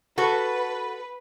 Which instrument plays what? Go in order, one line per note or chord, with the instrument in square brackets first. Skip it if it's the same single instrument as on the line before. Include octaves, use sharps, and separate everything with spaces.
[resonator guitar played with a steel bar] F#4 A4 [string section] B4